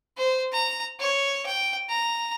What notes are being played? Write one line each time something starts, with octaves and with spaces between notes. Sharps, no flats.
C5
A#5
C#5
G5
A#5